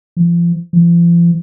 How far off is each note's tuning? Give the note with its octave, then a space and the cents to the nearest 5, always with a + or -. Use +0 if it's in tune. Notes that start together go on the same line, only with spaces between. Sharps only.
F3 -35
F3 -40